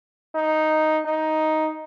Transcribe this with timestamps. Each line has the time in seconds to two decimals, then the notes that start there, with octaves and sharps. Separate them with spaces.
0.35 D#4
1.05 D#4